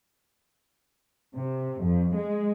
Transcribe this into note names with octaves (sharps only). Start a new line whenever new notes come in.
C3
F2
G#3